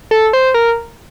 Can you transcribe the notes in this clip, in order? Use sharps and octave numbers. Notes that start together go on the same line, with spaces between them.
A4
C5
A#4